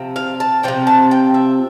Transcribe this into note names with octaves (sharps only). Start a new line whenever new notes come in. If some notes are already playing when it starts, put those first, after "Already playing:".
Already playing: C3 F3 C4
F5
A5
C3 F3 C4 G5
A5
G5
E5